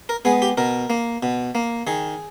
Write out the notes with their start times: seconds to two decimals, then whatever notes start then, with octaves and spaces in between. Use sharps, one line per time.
0.09 A#4
0.25 G#3 B3 G#4
0.42 G4
0.57 B2 A#4
0.90 A#3
1.23 B2
1.55 A#3
1.87 D#3 G#4